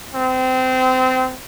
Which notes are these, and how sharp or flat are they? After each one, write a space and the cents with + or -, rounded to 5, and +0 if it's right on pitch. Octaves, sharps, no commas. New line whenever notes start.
C4 -25